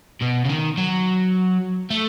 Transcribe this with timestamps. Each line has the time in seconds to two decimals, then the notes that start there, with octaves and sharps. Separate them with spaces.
0.21 B2
0.45 C#3
0.49 D#3
0.77 F#3
1.90 A3